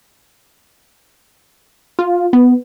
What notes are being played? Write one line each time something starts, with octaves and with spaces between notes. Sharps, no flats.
F4
B3